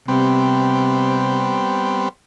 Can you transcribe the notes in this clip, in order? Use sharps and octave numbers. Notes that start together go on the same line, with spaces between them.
C3 G3 B3 C4